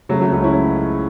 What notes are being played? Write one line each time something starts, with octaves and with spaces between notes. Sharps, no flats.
C#3 F#3 A3
F#3 A3
C#2 A3 C#4
C#4 E4